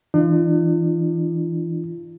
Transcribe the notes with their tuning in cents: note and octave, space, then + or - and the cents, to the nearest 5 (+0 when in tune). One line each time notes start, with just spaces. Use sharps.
E3 +0 D4 +45 F4 -35